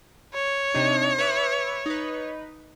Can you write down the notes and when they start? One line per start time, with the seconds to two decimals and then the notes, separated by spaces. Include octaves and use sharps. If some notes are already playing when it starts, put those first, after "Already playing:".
0.34 C#5
0.74 C3 D4 D#4
1.18 B4 E5 D6
1.86 D#4 B4